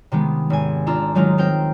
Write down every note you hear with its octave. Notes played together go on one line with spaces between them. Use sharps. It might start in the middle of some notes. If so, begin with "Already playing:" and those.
C3 D#3 G#3 B3
G#1 G#5
D4 F4 A#5 C6 E6
D#3 F#3 G#3 D#4 F4
C4 A#4 C5 G5